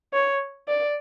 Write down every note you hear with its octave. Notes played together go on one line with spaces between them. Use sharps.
C#5
D5